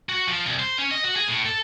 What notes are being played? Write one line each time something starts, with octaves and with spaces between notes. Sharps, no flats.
F#4
F3
C2
C5
C#4
D#5
F#4
G#4
A2
A4